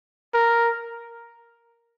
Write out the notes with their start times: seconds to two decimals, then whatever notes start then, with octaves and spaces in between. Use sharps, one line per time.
0.34 A#4